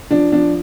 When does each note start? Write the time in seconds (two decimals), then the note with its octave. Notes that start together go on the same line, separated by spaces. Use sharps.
0.11 F3 D4
0.32 F3 D4